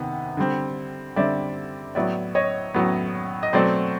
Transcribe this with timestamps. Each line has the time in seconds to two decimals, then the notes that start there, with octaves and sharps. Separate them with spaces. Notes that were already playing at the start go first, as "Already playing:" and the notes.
Already playing: C3 D#3 B3 F#5
0.37 D3 G3 C4
1.16 D3 G3 C4 D5 E5
1.95 A2 F#3 B3 D5 E5
2.35 C#5 D#5
2.75 A2 F#3 B3
3.43 D#5
3.53 B2 F#3 A3 C4 C5 D5